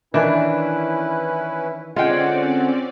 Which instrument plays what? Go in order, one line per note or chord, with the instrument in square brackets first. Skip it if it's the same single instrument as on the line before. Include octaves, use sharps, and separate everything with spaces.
[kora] D#3 E3 [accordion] C#4 E4 B4 [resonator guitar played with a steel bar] D4
[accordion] D3 F#5 [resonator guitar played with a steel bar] G#3 G5 [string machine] C4 C#4 D5 [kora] F4